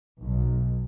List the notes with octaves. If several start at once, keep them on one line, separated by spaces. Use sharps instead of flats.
B1